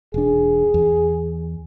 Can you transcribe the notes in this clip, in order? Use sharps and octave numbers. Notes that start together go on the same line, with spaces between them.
E1 D4 G#4
E2